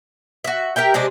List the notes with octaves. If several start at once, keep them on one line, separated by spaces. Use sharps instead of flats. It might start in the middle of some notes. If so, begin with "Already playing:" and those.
F#4 E5
G4 A#4 E5 G5
C3 G#3 C4 D4